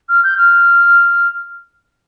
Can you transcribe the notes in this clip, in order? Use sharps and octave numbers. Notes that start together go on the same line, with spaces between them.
F6
G6
F6